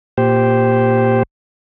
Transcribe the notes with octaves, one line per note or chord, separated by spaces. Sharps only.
A#2 G4 C5